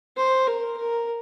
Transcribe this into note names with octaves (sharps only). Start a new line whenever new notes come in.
C5
A#4
A#4